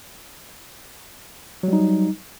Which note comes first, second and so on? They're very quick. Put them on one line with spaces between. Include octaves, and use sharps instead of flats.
F#3 G3 D#4